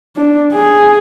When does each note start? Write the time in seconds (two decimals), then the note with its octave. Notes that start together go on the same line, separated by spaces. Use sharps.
0.16 D4
0.53 G#4